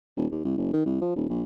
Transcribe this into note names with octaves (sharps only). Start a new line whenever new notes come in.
D#1
D#2
C2
F#1
D#3
C2
F3
D#1
A#1